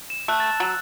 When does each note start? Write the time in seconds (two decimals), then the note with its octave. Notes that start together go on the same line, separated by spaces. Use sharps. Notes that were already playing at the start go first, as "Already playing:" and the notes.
0.10 E7
0.28 A3 E6 F#6
0.40 A6
0.60 F#3